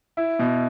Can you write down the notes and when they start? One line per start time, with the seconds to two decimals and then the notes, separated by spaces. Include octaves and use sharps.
0.17 E4
0.39 B2